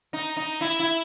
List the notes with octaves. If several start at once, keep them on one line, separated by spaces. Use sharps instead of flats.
D#4
D#4
E4
E4